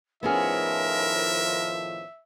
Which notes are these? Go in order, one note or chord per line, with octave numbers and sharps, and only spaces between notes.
A2 D#3 F3 B3 C#4 G#4 A#4 E5